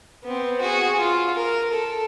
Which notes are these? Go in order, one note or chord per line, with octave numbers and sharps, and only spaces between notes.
B3 C4
F#4 G#4
F4
A#4
A4